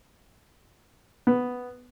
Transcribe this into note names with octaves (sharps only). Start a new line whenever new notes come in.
B3